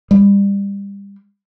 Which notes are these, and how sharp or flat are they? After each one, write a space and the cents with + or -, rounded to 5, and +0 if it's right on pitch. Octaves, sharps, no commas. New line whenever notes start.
G3 +30